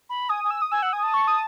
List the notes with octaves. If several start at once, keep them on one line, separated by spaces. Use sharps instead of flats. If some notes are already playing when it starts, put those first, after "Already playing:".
B5
G#5 D#6
G#5
E6
D#6
G#5 E6
F#5
G#5 D#6
A5
C#6
D#6